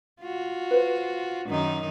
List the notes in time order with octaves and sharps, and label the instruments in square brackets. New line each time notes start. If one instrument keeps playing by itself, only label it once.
[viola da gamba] F4 F#4
[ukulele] B4 C5
[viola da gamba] F#2 D#3 D#4